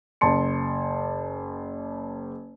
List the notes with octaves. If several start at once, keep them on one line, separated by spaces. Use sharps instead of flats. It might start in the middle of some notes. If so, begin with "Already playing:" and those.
F#1 A5 C6 C#7